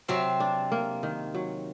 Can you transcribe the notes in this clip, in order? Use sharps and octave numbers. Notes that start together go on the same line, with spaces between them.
C3 F#3 C4
D4
A#3
D#3
F#3